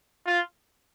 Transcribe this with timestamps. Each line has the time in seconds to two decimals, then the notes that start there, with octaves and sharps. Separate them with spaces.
0.26 F4